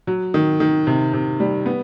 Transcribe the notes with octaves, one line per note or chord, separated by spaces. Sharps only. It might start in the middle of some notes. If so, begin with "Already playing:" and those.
F#3
D#3
D#3
C3
C3
G3
B3